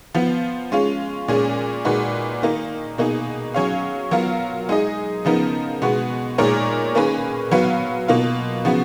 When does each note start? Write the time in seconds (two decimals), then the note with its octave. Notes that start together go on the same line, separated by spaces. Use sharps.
0.14 F3 B3 F4
0.72 G#3 C#4 F4
1.28 A#2 G#3 C#4 G#4
1.85 A#2 G#3 D#4 F#4 B4
2.42 D#3 A#3 D#4
2.98 B2 A#3 D#4 G#4
3.54 F#3 C#4 G#4 C#5 F5
4.11 F#3 B3 F4 A#4 F5
4.69 G#3 D#4 G#4 D#5
5.25 C#3 F3 B3 D#4 A#4
5.82 B2 G#3 B3 F#4
6.38 A#2 G#3 D#4 A#4 C#5
6.95 D#3 A#3 C#4 G#4 B4
7.51 F#3 B3 F#4 B4 F5
8.08 B2 A#3 F4
8.65 C#3 F3 B3 F#4